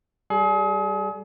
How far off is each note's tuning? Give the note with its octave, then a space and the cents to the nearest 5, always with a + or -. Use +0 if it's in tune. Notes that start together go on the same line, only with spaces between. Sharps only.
G3 -5 G#4 +35